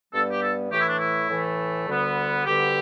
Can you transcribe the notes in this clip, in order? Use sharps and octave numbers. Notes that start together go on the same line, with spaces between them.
G2 G3 B3 A4
G4
A4
A2 E3 A3 G4
E4
D4
E4
A2 E3 A3
D2 D3 G3 B3
D2 D3 G3 B3 G4